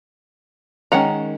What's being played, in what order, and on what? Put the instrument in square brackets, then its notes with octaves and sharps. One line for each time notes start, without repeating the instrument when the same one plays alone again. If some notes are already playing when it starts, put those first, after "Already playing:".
[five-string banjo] D#3 G#3 C#4 F#5 A#5